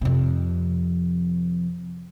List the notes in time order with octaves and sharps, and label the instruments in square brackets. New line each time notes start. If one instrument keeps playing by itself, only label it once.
[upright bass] F2 C3